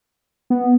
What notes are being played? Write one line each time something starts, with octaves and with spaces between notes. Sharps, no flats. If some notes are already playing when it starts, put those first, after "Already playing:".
B3